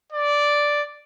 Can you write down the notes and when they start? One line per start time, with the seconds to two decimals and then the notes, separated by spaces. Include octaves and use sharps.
0.13 D5